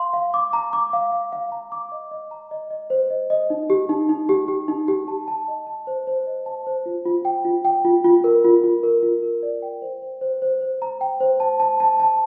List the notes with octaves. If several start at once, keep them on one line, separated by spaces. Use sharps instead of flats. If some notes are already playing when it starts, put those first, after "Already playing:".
Already playing: F5 C6
F5
D6
A#5
D6
F5
F5
F5
A#5
D6
D#5
D#5
A#5
D#5
D#5
C5
D#5
D#5
D#4
G4
D#4
D#4
G4
G4
D#4
G4
A5
A5
D#5
A5
C5
C5
D#5
A5
C5
F4
F4
G5
F4
G5
F4
F4
A#4
F4
F4
A#4
F4
A#4
D5
G5
C5
C5
C5
C5
C5
A#5
G5
C5
A5
A5
A5
A5